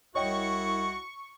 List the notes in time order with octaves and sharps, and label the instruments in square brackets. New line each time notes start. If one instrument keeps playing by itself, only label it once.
[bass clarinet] C2 [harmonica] E4 F#4 [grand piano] C#5 D#5 G5 [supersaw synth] C#6